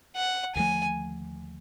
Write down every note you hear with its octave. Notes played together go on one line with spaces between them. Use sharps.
F#5
D#2 D3 F3 A3 G#5